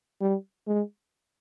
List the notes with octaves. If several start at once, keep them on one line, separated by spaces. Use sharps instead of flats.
G3
G#3